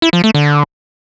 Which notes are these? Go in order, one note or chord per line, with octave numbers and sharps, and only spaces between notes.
E4
F3
A3
D3